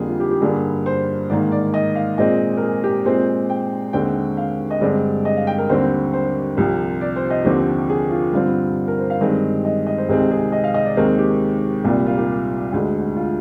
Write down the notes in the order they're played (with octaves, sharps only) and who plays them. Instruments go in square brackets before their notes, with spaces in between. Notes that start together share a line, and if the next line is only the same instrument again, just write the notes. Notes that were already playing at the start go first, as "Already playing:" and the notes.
Already playing: [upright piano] F2 D3 G3 A#3 G#4
F4
G4
G4
G2 D3 G3 A#3 G#4
C5
G#2 D#3 A#3 D5
D5
D#5
F5
A#2 G#3 C4 D#5
A#4
G#4
G4
A#2 G#3 C4 C5
G5
D#2 D3 G#3 C4 G5
F5
D#5
G2 D3 G#3 C4 D5
D#5
F5
G5
A#4
D#2 D3 G3 C4 C5
C5
C2 C3 F3
D5
C5
D#5
D#2 D3 F3 C4 G4
G#4
F4
G2 D3 G3 C4 F4
A#4
C5
F5
G2 D#3 G#3 C4 D#5
D#5
D#5
C5
C2 C3 D#3 G#3 C4 G#4
G#4
D#5
F5
D#5
D5
D#2 D#3 G#3 C4 A#4
G4
C2 A#2 G3 A#3 F4
F4
G4
D2 D3 G#3
F4